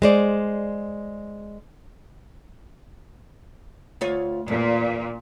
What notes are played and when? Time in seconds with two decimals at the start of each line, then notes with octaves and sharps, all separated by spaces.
0.02 G#3 C5 D5
4.01 D2 F4 C#5
4.48 E2 A#2